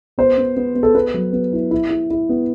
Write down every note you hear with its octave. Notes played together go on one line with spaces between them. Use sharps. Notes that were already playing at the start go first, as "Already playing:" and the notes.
B3 C5
B3
B3
B3
A4
B3 B4
F#3
B3
E4
E4
E4
E4
B3